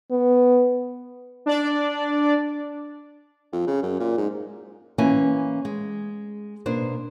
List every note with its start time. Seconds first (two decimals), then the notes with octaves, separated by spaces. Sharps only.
0.11 B3
1.46 D4 D5
3.52 F2
3.67 C#3
3.83 F#2
4.00 A#2
4.17 G#2
4.98 E3 A#3 C#4 E4 G#5
5.65 G#3
6.66 B2 A#3 D4 C5